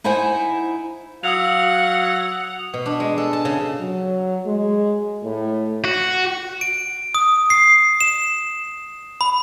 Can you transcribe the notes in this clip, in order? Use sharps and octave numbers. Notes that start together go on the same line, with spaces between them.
D#4 E4 C5 F#5 G#5
F#3 F5 F#5 D#6 E6 F7
B2
D4
G#3
A4
A5
C#3
F#3
G#3
A2
F#4
D7
D#6
C7
E7
B5